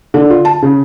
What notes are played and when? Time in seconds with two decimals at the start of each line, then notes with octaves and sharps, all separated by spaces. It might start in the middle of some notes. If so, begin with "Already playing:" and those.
0.14 D3
0.30 F4
0.45 A5
0.62 C#3